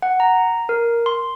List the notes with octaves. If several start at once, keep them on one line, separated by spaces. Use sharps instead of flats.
F#5
A#5
A#4
C6